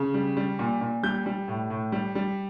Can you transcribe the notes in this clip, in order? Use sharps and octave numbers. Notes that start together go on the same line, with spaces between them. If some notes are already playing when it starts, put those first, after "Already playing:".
Already playing: C#3
G3
G3
A#2
A#2
G3 G6
G3
A2
A2
G3
G3